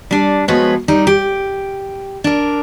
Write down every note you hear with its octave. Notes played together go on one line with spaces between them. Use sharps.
G3 D4
F3 G#3 B3 F#4 B4 C#5
G3 D#4
G4
D4 A#4